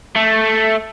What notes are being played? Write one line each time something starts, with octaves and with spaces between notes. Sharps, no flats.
A3